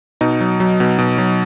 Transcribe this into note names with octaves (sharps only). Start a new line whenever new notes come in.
B2 D#4
F#3
F#3
B2
B2
F#3